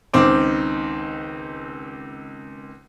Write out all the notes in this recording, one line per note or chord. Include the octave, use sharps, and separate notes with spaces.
C#2 D#3 C4 D6